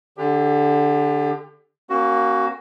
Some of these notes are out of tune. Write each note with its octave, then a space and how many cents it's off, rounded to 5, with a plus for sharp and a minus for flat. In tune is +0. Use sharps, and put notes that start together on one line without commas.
D3 +0 G4 +30
A#3 +0 C#4 -25 F#4 +20